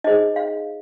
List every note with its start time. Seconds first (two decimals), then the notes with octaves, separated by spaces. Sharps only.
0.04 D#4 G#4 C5 D#5
0.36 F5